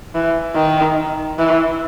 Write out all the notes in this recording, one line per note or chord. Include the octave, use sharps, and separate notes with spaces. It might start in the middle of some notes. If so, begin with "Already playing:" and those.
E3
D#3
E3